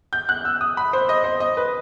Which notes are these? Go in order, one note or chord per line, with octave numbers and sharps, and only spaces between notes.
G6
F#6
E6
D#6
B5
C5
D#5
C5
D#5
B4